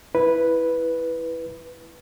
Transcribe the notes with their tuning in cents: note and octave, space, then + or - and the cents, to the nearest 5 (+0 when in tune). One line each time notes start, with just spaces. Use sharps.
E4 +0 B4 -5